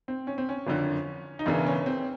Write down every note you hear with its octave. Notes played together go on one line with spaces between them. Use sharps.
C4
C#4
C4
C#4
F#1 F2 D3
D#4
E1 E2 C#3 E3 D4
C#4
C4